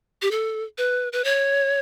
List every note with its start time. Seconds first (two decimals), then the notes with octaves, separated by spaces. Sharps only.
0.22 G4
0.31 A4
0.78 B4
1.13 B4
1.24 C#5